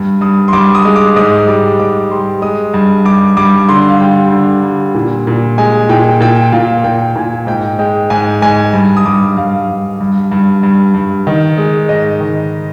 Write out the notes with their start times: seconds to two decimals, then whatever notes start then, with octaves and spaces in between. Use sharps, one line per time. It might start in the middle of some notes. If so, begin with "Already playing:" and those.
Already playing: G2
0.21 G2 D#6
0.48 C6
0.53 G2 D6
0.75 D#6
0.85 G#3
0.96 D6
1.16 G#2 D#6
1.47 G3 D6
1.79 G#2 D6
2.11 G3 C6
2.42 G#3 D#6
2.74 G2
3.05 G2 D6
3.37 G2 D6
3.69 D3 C6
3.89 F5
4.00 G3 G5
4.32 D3
4.63 G3
4.94 A#2
5.27 A#2
5.58 G#3 G#5
5.89 A#2 G5
6.21 A#2 G5
6.52 A#2 F5
6.84 A#2 G5
7.15 A#2 G#5
7.47 G#2 G5
7.79 G#3 G5
8.10 G#2 G#5
8.42 G#2 G#5
8.73 G2
8.97 D#6
9.05 G2 D6
9.37 G2 F5
9.68 G2
10.01 G2
10.32 G2
10.63 G2
10.94 G2
11.27 D#3
11.58 G#3
11.89 G#2 D#5
12.20 D#3